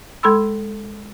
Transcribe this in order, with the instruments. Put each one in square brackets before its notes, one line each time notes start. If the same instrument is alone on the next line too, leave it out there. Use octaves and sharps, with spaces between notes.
[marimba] G#3 A4 B5 C6 E6